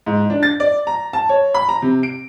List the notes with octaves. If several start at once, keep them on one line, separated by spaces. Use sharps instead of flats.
G#2
D4
A6
D5
A#5
A5
C#5
B5
A#5
C3
D7